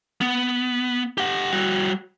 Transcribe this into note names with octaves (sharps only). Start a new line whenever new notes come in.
B3
G4 F#5
G3 F#4